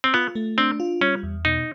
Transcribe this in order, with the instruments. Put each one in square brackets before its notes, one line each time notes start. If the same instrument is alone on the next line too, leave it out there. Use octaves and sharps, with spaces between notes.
[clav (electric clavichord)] C4
[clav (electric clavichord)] B3 [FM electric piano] F4
[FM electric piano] A3
[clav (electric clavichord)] C4 [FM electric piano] D4
[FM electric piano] F4
[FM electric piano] G3 [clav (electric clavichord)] C#4
[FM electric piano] E2
[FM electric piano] B2 [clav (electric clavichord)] D#4